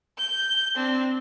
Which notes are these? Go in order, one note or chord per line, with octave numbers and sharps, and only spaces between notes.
G6
C4 D4